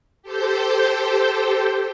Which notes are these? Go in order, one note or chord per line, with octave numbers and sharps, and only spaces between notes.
G4 A4 C5 G5